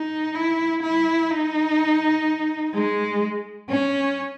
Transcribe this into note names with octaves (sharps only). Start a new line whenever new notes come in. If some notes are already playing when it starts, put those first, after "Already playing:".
Already playing: D#4
E4
E4
D#4
G#3
C#4